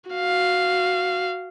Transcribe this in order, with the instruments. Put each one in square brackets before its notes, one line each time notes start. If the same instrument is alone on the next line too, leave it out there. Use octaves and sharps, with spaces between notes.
[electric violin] F#4 F5